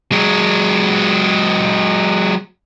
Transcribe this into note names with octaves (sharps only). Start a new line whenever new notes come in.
F#3 G#3